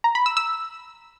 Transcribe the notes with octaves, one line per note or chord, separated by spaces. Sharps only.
A#5
B5
E6
E6